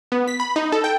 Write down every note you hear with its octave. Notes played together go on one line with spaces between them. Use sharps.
B3
B6
B5
D#4
A4
G5